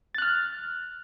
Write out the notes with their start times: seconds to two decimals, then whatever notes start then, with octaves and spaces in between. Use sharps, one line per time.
0.15 A6
0.18 F#6
0.22 F6